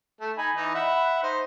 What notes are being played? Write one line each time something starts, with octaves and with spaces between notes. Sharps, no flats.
A3
D#4 G#5 B5
E3 D#4
E5 F#5 B5
D#4 C5